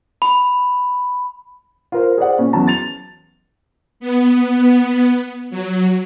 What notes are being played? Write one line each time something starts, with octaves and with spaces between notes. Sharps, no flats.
B5
F4 A#4 C5
G#4 C5 D5 F#5
A#2 C#4
E2 F#3 C#4 A5 A#5
A6 F7
B3
F#3